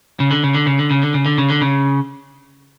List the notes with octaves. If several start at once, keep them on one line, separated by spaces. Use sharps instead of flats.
C#3
D3
C#3
D3
C#3
D3
C#3
D3
C#3
D3
C#3
D3
C#3